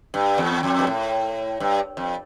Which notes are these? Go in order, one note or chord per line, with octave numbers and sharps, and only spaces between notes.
G2
E2
F2
G2
A2
G2
F2